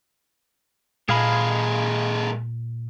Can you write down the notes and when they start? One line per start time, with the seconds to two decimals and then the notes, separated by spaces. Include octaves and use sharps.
1.09 A#2 G#3 A#3 G#4 F5 B5